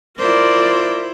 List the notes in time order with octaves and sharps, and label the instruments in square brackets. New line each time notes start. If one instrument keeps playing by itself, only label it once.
[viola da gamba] E4 F4 C5 [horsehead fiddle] A#4 D5